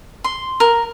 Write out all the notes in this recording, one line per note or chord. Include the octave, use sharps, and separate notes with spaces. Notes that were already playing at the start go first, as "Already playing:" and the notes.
C6
A#4